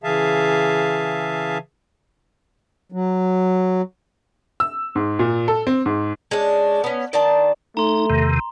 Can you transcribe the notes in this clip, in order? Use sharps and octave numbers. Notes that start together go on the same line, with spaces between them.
C#3 E3 G#4 E5 F5 A5
F#3
E6
G#2
A#2
A4
C4
G#2
G#3 C#4 D4
B3 C#4
D#3 D5 G5 A5
A3 D#4 A#5 C6
E2 C3 D#3